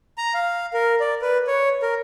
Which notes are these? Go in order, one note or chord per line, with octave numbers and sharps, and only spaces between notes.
A#5
F5
A#4
D5
B4
C#5
A#4